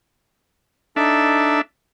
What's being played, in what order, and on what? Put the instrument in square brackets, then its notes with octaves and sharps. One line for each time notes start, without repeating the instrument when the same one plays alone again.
[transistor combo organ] D4 E5 [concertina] D#4 A4